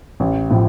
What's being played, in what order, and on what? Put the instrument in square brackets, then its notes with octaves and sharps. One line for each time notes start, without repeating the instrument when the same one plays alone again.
[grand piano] A1
A2 F3